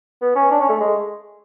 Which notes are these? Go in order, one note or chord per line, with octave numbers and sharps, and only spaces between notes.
B3
C#4
D4
C#4
A3
G#3